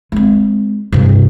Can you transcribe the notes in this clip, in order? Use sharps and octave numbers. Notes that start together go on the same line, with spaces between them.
G#3 C4
G2 C3